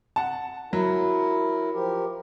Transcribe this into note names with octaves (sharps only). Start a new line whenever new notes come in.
F#5 A5
F#3 E4 A#4
F3 G4 A#4